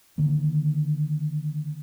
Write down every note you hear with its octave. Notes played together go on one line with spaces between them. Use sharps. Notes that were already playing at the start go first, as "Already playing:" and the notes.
D3 D#3 A#3